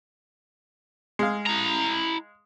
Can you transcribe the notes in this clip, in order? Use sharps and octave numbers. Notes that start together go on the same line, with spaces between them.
G#3 F5
E4 A#5